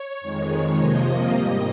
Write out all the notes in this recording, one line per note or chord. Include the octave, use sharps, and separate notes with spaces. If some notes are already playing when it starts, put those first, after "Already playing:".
Already playing: C#5
F2 D#3 G#3
C3 F3 A#3 D#5
G#2 G3 A#3